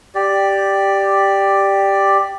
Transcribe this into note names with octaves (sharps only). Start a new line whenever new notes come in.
G4 D5